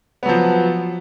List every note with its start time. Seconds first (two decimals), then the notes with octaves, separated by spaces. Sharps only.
0.23 B3
0.26 F#3
0.29 F3